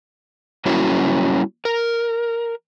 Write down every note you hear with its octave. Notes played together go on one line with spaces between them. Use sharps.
F#3 G3 A#3 C#4 E4 F#4
A#4